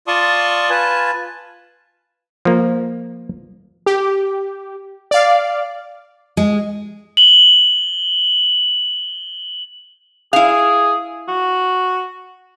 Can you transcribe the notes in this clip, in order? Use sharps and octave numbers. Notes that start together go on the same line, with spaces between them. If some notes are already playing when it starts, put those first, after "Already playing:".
F4 D5 A5 C6 C#6 D#6
F4 B4 G#5 A5
F3 A#3
G4
D5 F5
G#3
F#7 G7
E4 G#4 F5
F#4